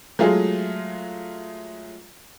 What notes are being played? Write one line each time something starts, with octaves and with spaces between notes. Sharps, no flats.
F#3 G#3 A3 F4 G#4